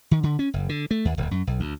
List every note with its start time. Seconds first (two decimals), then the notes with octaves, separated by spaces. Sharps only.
0.11 D#3
0.23 D3
0.39 C#4
0.54 F#1
0.69 D3
0.91 A3
1.05 D#2
1.18 D1
1.31 F#2
1.47 B1
1.60 D2